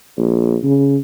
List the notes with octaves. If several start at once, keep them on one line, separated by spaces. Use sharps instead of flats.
A#1
C#3